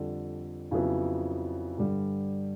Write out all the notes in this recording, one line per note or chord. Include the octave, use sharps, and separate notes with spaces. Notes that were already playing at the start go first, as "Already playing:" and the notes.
Already playing: F2 D3 G3
F2 C#3 F#3 B3 E4
G2 D3 G3